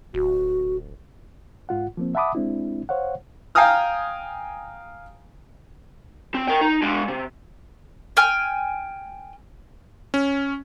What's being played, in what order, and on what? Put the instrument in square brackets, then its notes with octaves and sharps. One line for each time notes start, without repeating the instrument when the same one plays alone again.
[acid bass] D1 [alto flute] F#4
[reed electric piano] G#2 F4 F#5
F3 A#3 C4
E5 F#5 A5 B5 D6 D#6
G#3 C4 D4 E4
C5 C#5 F5 F#5
[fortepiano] F5 G5 G#5 A#5 D#6 F6
[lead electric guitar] C4
A#4 G5
D#4
G#3 D4
C3
[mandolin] G5 G#5 F6
[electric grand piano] C#4